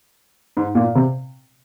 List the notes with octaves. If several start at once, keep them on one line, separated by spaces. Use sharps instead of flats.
G#2
A#2
C3